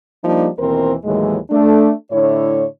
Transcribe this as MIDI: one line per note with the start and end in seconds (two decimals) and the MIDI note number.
0.23 0.48 53
0.23 0.48 55
0.23 0.48 58
0.23 0.48 62
0.23 0.48 63
0.58 0.94 39
0.58 0.94 47
0.58 0.94 52
0.58 0.94 60
0.58 0.94 70
0.58 0.94 72
1.04 1.37 39
1.04 1.37 45
1.04 1.37 52
1.04 1.37 54
1.04 1.37 56
1.50 1.92 57
1.50 1.92 62
2.11 2.65 45
2.11 2.65 50
2.11 2.65 64
2.11 2.65 73